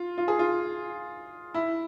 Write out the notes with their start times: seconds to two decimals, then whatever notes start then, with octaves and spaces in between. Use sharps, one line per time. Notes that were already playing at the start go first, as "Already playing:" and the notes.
Already playing: F4
0.18 F4
0.28 G#4
0.39 F4
1.54 E4